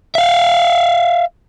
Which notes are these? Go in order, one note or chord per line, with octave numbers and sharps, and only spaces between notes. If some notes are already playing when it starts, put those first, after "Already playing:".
E5 F5